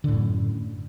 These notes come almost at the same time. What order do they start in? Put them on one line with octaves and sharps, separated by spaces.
D3 A2 F#2